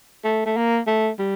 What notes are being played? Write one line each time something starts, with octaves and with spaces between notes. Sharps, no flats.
A3
A3
A#3
A3
G3